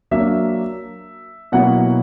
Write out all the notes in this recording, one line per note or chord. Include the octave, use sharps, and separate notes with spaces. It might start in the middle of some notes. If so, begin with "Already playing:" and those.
F#3 A#3 D4 E5
B2 F#3 A#3 E4 F#5